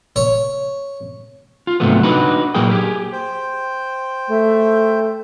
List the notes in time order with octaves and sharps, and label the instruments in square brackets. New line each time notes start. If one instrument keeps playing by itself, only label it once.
[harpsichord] C#5
[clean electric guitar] F4
D2 G#2 C3 F#3 A3 B3
D4 D#4 F#4 B4
A#2 F#3 A#3 G#4 A#4 G5
G4 G#4
[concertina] C5 G5
[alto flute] A3